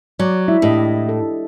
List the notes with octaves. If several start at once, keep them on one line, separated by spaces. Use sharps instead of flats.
F#3 D5
G#3 E4 E5
A2 D4 G4 D#5
A4